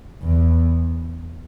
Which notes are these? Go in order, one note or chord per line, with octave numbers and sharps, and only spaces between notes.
E2